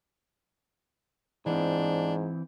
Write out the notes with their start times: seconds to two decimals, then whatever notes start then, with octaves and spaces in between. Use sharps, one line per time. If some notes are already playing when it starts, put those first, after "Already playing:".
1.46 G#2 E3 C4 D4